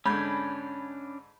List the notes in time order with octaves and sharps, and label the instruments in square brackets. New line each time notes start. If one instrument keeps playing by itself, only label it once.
[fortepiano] G#2 D3 [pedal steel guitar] C#4 D4 [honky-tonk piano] B5 G6 G#6